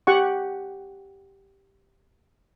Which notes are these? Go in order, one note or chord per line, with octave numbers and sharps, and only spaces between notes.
G4 F#5 C#6